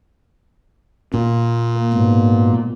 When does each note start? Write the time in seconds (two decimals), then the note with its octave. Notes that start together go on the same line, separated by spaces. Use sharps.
1.14 A#2 A#3
1.93 G#2 B2